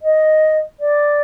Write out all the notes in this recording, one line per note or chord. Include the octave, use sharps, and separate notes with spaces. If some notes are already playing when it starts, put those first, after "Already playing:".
D#5
D5